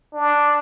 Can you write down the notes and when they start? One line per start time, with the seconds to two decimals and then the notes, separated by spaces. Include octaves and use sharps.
0.14 D4